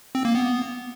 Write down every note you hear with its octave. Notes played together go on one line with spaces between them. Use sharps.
C4
A#3
B3